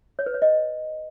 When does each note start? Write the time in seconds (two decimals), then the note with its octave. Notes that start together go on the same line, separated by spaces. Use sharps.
0.19 C#5
0.26 B4
0.34 C#5
0.42 D#5